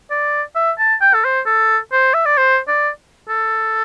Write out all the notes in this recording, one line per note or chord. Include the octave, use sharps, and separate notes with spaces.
D5
E5
A5
G5
A4
C5
A4
C5
E5
D5
C5
D5
A4